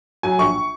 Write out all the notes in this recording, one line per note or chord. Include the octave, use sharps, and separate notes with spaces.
F#3 G#5
A#1 C#6